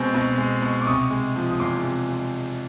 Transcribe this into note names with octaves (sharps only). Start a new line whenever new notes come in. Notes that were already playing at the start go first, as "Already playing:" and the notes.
Already playing: B2 G#3 C4
B2
G#3
B2
D6
C3 C#6 D#6
G#3
F3
D#6
E2 C6 D6
C3
G#3